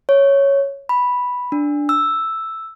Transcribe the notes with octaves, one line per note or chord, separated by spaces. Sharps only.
C#5
B5
D4
E6